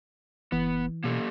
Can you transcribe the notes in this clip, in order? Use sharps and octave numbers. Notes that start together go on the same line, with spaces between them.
F#1 E3 B3
B2 A#3 G4 A4